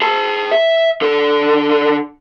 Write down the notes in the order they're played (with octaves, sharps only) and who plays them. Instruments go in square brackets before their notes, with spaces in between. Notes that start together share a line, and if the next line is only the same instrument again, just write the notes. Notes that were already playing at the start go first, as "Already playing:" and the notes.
[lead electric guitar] G#4 A5
E5
D3 A4